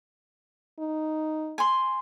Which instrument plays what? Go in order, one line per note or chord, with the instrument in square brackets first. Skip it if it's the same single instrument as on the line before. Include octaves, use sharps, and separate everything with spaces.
[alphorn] D#4
[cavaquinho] G#5 C6